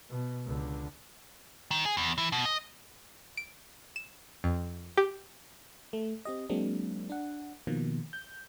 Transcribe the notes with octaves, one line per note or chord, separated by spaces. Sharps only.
B2
C#2 D3
D#3
G#4
E2
E3
B2
D#5
D7
E7
F2
G4
A3
C4 G4 D#5
F#3 G#3 A#3 C4 D4
D4 F#5
B2 D#3 F3 A#3
G6